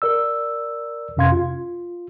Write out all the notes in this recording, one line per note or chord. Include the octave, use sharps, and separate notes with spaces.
A#4 D5 E6
F2 C3 C#4 F5 C6 G#6
F4